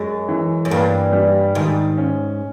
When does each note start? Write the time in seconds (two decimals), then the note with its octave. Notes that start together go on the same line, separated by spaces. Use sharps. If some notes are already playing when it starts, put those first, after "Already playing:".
Already playing: F#2 G#3
0.29 E3
0.65 F#2
0.71 G2 A#3
1.13 G3
1.55 G#2 D#3
1.98 C#4